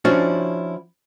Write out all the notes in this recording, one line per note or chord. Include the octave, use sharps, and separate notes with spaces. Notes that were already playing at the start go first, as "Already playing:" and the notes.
F3 C#4 D4 E4 F#4